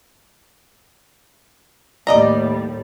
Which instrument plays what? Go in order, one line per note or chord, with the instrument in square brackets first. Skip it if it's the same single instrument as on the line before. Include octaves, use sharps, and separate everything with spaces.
[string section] D#2 A2 G3 [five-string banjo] D5 D#5 A#5